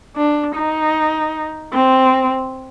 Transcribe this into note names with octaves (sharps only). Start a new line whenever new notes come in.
D4
D#4
C4